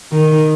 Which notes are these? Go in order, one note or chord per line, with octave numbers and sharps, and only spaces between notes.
D#3